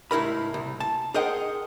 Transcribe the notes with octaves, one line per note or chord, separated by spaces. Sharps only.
C#2 A2 E4 A#4 B5
C2
A5
G#4 A#4 C5 D#5 F#5 G5